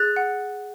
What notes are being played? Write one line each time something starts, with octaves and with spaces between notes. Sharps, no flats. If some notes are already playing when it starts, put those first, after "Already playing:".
Already playing: G#4 F#6 A6
F#5